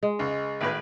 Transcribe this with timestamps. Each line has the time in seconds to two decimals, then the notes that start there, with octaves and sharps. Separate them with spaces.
0.03 G#3
0.19 C#2
0.61 G#1 A2 B4